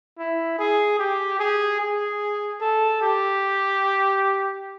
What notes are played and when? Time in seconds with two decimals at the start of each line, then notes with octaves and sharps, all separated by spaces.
0.19 E4
0.59 G#4
0.99 G4
1.39 G#4
1.80 G#4
2.61 A4
3.02 G4